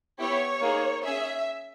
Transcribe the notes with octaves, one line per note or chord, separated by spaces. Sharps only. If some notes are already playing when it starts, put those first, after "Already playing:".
B3 E4 G4 C#5
A#3 D#4 G#4
C#4 G#4 E5